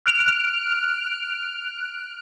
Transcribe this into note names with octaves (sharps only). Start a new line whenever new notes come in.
F6 F#6 D7 F7